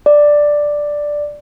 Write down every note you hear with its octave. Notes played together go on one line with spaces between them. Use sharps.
D5